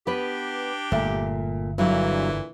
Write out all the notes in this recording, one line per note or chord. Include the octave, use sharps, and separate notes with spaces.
B3 D4 G4 B4
G1 A#2 A3
G2 A#2 D3 E3 F#3